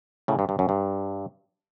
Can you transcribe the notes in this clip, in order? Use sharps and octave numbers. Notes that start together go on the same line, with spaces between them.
A2 C#3
G2
G2
F#2
G2